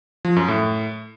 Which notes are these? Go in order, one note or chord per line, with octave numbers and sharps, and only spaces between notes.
F3
F#2
A2